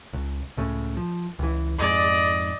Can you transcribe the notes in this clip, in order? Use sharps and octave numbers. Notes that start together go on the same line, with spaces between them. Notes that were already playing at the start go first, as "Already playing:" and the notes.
C#2
C#2 A2 C#3
F3
C#2 E3
F2 G#2 D5 D#5